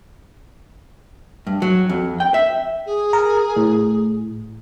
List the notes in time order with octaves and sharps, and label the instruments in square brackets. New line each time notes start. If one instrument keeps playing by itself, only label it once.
[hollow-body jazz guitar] G2
F#3
F2
G5
E5
[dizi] G#4
[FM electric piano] A#4
A2